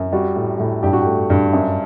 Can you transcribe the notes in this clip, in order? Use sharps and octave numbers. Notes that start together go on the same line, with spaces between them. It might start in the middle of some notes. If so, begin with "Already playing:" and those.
Already playing: F#2
G3 F#4
A2
A2
G2 G4
F#4
A3 G4
G2
F#2